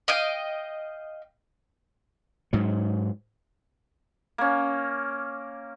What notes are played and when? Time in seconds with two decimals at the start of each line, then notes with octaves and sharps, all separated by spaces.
0.08 D#5 F5 G5
2.53 G#2 F#3
4.38 A#3 C#4